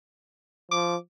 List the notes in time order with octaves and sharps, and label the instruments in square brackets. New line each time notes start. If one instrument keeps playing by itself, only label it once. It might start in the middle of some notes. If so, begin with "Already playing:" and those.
[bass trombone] F3 [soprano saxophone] D6